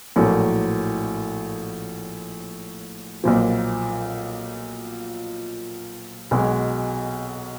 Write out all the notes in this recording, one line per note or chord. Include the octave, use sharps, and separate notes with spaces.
A#1 A2 F#3 A3
B1 A#2 F3
B1 B2 G#3